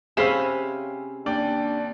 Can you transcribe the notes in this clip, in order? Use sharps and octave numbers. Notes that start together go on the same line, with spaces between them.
C3 C4 C#4 G#4 F5 B5 C7 E7
D#2 D4 D5 G5